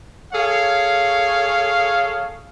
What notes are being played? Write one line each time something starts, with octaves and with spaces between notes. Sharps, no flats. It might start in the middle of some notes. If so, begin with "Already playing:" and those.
G#4 A4 C#5 F5